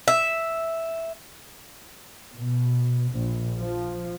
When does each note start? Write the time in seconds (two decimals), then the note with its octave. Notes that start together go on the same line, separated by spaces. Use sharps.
0.08 E5
2.35 B2
3.11 A#1
3.57 F3